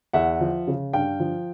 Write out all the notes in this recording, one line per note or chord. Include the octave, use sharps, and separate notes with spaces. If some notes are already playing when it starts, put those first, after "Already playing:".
E2 E5 F#5
F3
C#3
G2 F5 G5
F3